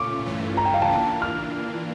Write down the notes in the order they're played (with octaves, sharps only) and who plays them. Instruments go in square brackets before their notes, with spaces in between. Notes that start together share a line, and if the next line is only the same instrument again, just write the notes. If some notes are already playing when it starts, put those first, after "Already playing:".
Already playing: [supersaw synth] A#2 A3 C#4 F4 [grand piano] C#6 D6
[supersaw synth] G2 E3 A3 C#4 F4
[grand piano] A#5
G5
F5
A5
[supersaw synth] E3 A#3 D4 F4
[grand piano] F6